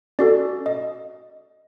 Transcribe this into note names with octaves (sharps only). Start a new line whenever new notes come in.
C#4 F#4 A4 D5
D#5